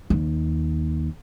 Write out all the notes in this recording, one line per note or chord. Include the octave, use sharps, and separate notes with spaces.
D#2